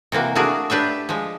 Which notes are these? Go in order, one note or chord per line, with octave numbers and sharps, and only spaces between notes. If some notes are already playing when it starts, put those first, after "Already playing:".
C3 E3 A#3 F#4
A3 D4 F#4 G#4 A#4
D4 G4 B4 E5
F3 G#3